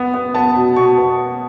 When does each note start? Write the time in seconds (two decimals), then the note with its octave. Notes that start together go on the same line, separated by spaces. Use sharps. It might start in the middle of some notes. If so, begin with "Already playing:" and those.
Already playing: B3
0.14 B3
0.34 B3 A5
0.56 B2
0.76 B2 C#6
0.98 B3